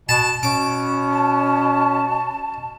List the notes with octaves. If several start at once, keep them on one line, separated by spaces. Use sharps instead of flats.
B2 A5
B2 C#4 D6
A5